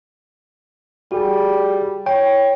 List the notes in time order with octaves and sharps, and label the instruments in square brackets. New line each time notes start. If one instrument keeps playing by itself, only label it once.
[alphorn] G3 [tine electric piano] F#4 G#4
[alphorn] C#5 [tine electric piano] G5